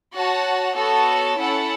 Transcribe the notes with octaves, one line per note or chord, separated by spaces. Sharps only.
F#4 C#5 F#5 A5
B3 F#4 A4 C#5 A5
C#4 E4 A4 F#5 A5